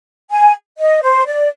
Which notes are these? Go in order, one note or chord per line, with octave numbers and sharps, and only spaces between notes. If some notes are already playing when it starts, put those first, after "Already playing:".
G#5
D#5
C5
D5